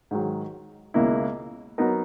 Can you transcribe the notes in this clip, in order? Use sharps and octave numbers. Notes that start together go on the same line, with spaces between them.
G#2 D#3 F#3
C#2 B2 A#3 E4
F#3 B3 D#4 A#4